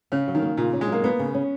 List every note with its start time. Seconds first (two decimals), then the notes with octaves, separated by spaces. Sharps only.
0.12 C#3 C#4
0.28 F#3
0.35 D#3
0.42 A#3
0.57 A#2 C#3
0.73 C#4
0.81 G#3
0.88 F#3 A#3
1.04 A#3 B3
1.19 C#3
1.34 C#4